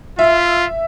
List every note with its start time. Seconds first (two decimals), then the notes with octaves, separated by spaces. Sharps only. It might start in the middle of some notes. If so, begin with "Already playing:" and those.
0.19 F4 E5